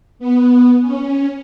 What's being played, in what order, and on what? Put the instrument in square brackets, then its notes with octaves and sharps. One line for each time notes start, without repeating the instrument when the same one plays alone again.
[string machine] B3
C#4